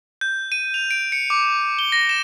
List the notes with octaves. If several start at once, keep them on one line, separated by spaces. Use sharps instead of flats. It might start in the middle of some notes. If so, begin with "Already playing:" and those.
G6
D#7
F7
D7
C#7
D6
G7
A#6
E7